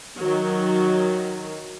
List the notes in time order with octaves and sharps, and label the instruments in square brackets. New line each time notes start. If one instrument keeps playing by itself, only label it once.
[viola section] D#3 F#3